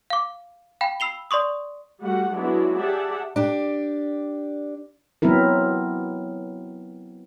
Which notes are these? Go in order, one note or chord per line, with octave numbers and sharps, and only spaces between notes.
F5 D6
F5 G5 B5
B5 E6 C7 F7 G7
D5 C6 C#6 D#6
G3 A3 F#4 F#5
F#3 G#3 B3 D4 E4 F#4
G4 G#4 D5 E5 F#5 A5
D4 G4
F#3 B3 C4 E4 A#4